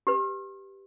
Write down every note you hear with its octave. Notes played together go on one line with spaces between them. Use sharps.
G4 B4